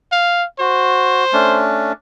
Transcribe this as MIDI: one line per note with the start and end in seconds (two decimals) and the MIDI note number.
0.12 0.45 77
0.60 1.24 66
0.60 1.64 72
1.33 1.92 57
1.33 1.92 61
1.33 1.92 62